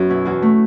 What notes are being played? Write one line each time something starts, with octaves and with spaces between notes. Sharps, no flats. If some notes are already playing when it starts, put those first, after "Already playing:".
Already playing: F#2 B3 C#4 F#4
B2 E4
E2 F#4
A3